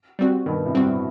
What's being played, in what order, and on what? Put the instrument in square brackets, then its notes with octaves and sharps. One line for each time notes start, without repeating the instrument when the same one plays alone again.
[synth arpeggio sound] G3 C4 F#4
[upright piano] G2 B2 [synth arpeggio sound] D#3
[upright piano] A2 C3
[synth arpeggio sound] G3 C4 F#4